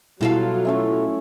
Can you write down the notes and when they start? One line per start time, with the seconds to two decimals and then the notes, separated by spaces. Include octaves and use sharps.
0.21 B2 F#3 G3 E4 F4 A4 F5
0.65 A3 C#4 E5